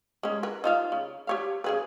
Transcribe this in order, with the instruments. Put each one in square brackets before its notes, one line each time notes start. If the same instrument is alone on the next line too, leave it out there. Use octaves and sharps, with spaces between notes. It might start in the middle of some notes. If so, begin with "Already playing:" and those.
[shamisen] G#3 C#4
A#4 B4
D#4 F4 F5
C#3
G4 C#5 F5
C#3 G#4 B4